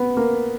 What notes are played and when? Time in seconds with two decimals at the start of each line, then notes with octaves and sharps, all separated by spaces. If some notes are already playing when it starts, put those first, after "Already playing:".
Already playing: B3
0.17 A#3